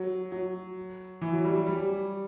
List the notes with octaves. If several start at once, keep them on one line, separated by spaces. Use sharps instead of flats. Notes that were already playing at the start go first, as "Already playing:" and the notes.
Already playing: F#3
F#3
E3
F#3
G3
G3
G3